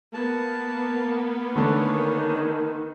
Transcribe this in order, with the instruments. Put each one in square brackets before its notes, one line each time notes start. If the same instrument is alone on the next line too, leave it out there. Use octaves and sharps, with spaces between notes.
[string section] A#3 B3 [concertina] A5
[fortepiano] D3 A3 [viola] D#3 [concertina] D4 G#4 C#5